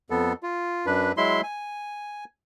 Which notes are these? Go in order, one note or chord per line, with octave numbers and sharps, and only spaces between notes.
F2 B3 A4
F4
F#2 D4 B4
F#3 G#3 E4 E5 C6
G#5